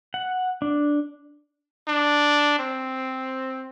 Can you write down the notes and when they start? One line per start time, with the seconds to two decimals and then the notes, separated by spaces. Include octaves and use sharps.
0.14 F#5
0.62 D4
1.87 D4
2.59 C4